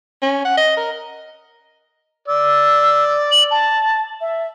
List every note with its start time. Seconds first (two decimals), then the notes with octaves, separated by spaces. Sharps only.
0.22 C#4
0.45 F#5
0.57 D#5
0.77 A#4
2.28 D5 E6
3.32 F#7
3.51 A5
4.21 E5